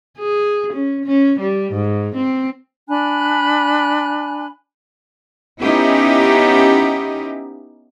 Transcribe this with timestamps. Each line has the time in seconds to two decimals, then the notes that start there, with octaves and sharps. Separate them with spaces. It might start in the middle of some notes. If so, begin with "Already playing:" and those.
0.18 G#4
0.73 C#4
1.05 C#4
1.39 G3
1.73 G#2
2.16 C4
2.89 D4 G#5 B5 F#6
5.60 B3 C#4 D#4 E4 G4